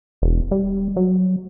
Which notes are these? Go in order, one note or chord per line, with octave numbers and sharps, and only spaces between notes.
E1
G3
F#3